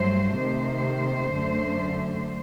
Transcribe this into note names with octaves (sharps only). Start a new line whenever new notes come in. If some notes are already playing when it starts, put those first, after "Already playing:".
Already playing: G2 F#3 A3 C5
C3 D#3 A3 C5
F#2 D3 A3